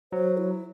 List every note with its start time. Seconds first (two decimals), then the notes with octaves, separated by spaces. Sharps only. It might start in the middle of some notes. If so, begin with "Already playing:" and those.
0.12 F#3 C5
0.37 E4